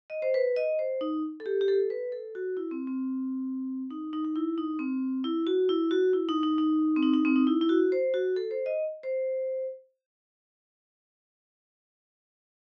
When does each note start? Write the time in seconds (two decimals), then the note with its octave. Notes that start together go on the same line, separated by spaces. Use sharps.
0.10 D#5
0.22 C5
0.34 B4
0.56 D#5
0.79 C5
1.01 D#4
1.40 A4
1.46 G4
1.61 G4
1.68 A4
1.90 B4
2.12 A4
2.35 F#4
2.57 E4
2.71 C4
2.87 C4
3.91 D#4
4.13 D#4
4.25 D#4
4.36 E4
4.58 D#4
4.79 C4
5.24 E4
5.47 F#4
5.69 E4
5.91 F#4
6.13 E4
6.29 D#4
6.43 D#4
6.58 D#4
6.96 C4
7.03 D#4
7.13 D#4
7.25 C4
7.36 D#4
7.47 E4
7.61 E4
7.69 F#4
7.92 C5
8.14 F#4
8.36 A4
8.51 C5
8.66 D#5
9.03 C5